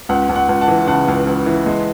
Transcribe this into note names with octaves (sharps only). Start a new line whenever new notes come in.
C#2 F#5
C#2
F#5
C#2
F#5 A5
E3
C#3 F#5 A5
C#2
C#2
E3
G#3